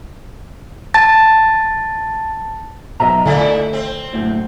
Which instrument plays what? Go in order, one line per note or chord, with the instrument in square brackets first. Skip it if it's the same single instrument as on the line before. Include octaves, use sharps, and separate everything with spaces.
[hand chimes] A5 A6
[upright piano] B1 [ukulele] D#5 E5 A#5
[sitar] A2 E4 [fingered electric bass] D3 [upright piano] A3 A4
[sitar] C4
[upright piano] F#1 D2 A2